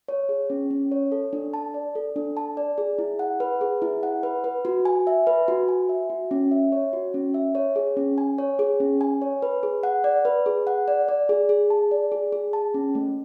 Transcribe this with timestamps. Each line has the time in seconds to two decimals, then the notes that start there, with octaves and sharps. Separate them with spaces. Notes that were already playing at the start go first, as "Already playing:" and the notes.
0.08 C#5
0.29 G#4
0.50 C#4
0.71 C#4
0.92 C#5
1.12 A4
1.33 D4
1.54 A5
1.74 D5
1.95 A4
2.16 D4
2.37 A5
2.57 D5
2.78 G#4
2.99 E4
3.19 F#5
3.40 B4
3.61 G#4
3.82 E4
4.03 F#5
4.23 B4
4.44 B4
4.65 F#4
4.85 G#5
5.07 E5
5.27 B4
5.48 F#4
5.68 G#5
5.89 E5
6.10 F#4
6.31 C#4
6.51 E5
6.72 C#5
6.93 F#4
7.14 C#4
7.34 E5
7.55 C#5
7.76 G#4
7.97 C#4
8.18 G#5
8.38 C#5
8.59 G#4
8.80 C#4
9.01 G#5
9.22 C#5
9.42 B4
9.63 G#4
9.83 F#5
10.04 D5
10.25 B4
10.46 G#4
10.67 F#5
10.88 D5
11.08 D5
11.29 G#4
11.49 G#4
11.70 A5
11.91 D5
12.12 G#4
12.32 G#4
12.53 A5
12.74 C#4
12.95 A3